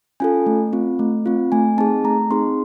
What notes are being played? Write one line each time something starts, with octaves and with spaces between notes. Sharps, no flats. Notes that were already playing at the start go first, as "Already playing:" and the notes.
C#4 F4 A4 G#5
A3
C4 F4
A3
C4 F4
A3 G#5
C4 D#4 G#4 A5
A3 A#5
C4 D#4 G#4 C6